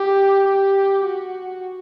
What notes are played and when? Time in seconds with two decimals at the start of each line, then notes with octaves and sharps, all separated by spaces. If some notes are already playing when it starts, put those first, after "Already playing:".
Already playing: G4
0.48 G4
1.05 F#4